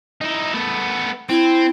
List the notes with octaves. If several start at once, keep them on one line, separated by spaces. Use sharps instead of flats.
D#4 E4
A3 B3
C4 E4